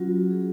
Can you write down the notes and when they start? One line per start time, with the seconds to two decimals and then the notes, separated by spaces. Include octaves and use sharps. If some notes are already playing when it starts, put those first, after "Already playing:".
Already playing: F#3 C#4 F4 F#4
0.30 G#4